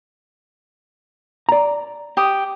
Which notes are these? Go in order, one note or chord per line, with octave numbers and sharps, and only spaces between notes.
D5 A#5
G4 D#6